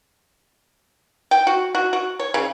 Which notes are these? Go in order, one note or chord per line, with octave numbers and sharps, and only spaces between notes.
G5
F#4
F#4
F#4
C#5
C#3